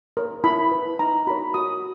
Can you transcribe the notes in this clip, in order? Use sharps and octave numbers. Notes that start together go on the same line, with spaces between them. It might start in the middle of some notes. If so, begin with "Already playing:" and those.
A#4 C#5
E4 B5
B4
D#4 A#5
F#4 A#4 C#5 B5
F#4 D#6